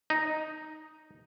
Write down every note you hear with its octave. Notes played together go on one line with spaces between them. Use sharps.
D#4